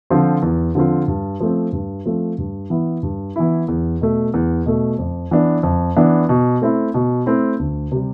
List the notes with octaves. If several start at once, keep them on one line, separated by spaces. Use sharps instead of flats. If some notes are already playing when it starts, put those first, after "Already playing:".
D3 F3 C4 F4
E2
D3 F3 C4 F4
G2
F3 A3 C4
G2
F3 A3 C4
G2
E3 B3 E4
G2
E3 B3 E4
E2
B2 A3
E2
B2 A3
F2
E3 B3 D4
F2
E3 B3 D4
B2
A3 C4 E4
B2
A3 C4 E4
D2
C3 G3